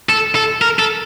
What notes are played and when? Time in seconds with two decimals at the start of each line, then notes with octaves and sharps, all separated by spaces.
0.09 A4
0.35 A4
0.62 A#4
0.79 A4